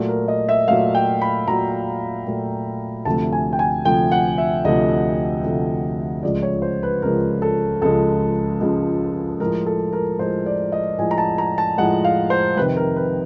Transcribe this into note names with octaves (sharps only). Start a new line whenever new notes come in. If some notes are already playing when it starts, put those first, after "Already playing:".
Already playing: A#2 F#3 A3
A#4
D#5
E5
A#2 F#3 A3 F5
G5
B5
A#2 F#3 A3 A#5
A#2 F#3 A3
D2 C3 F3 A3 A5
G#5
G5
G#5
D2 C3 F3 A3 G5
F#5
E5
D2 C3 F3 A3 D#5
D2 C3 F3 A3
C#2 C#3 F3 G#3 D5
C#5
C5
B4
C#2 C#3 F3 G#3 A#4
A4
C#2 C#3 F3 G#3 A4
C#2 C#3 F3 G#3
A2 F3 G#3 A#4
A4
A#4
A2 F3 G#3 C5
D5
D#5
A2 F3 G#3 G#5
A#5
A5
A#5
A5
A2 F3 G#3 F#5
F5
C5
F2 C3 D#3 B4
A#4
B4